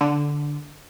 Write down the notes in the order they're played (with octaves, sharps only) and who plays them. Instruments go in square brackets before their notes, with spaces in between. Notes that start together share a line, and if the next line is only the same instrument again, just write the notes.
[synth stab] D3